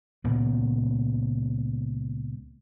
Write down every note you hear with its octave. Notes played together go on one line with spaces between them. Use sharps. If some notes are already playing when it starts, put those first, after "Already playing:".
C#2 A#2 D#3 B3